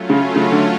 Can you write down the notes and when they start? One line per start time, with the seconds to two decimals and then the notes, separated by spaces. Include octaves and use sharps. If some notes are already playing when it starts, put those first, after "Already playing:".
Already playing: F#3 A3 C#4 F4
0.10 C#3
0.36 C#3
0.52 D3